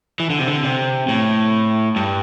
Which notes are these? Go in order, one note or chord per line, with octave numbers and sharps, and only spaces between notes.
E3
D3
C3
D3
C3
A2
G2